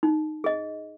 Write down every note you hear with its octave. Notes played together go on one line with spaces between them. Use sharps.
D#4
G#4 D#5